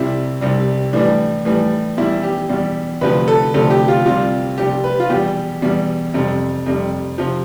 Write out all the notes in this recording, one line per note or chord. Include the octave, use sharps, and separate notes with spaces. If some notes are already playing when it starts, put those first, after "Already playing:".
Already playing: C2 C3 G3 E4
C2 C3 G3
A2 E3 G3 D4
A2 E3 G3
E2 B2 G3 E4
G4
E2 B2 G3
D2 C3 F3 B4
A4
D2 C3 F3 A4
G4
F4
C2 C3 G3 F4
C2 C3 G3 G4
B4
F4
E2 B2 G3 G4
E2 B2 G3
F2 C3 G3
F2 C3 G3
C3 F3